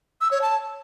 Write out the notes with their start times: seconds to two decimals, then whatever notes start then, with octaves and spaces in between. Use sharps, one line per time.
0.21 E6
0.31 C#5
0.42 A5